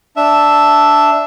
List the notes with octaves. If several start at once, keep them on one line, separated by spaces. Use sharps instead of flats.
D4 E5